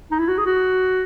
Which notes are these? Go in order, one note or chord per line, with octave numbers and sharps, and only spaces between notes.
D#4
E4
F#4
G#4
F#4